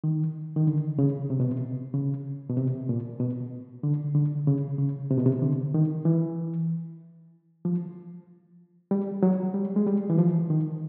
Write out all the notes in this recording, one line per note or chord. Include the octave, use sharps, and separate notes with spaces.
D#3
D#3
D3
C#3
C3
B2
C3
C#3
B2
C3
A#2
B2
D3
D3
C#3
C#3
C3
B2
C3
D3
D#3
E3
F3
G3
F#3
G3
G#3
G3
E3
F3
D#3